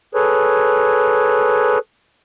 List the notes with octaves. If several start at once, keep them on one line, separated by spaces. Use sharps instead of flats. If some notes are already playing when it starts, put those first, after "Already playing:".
G#4 A4 B4 C#5